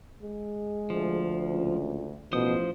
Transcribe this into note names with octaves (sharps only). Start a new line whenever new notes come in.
G#3
D2 F3
C#2
A1 B2 F3 C5 D#6